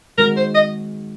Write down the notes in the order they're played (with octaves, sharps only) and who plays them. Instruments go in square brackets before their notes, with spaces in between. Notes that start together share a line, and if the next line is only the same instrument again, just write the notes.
[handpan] D#3 G#3 C4 F#4 [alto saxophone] A#4
[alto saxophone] C5
D#5